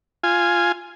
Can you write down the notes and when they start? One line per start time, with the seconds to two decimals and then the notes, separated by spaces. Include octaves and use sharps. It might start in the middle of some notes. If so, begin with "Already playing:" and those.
0.23 F4 G#5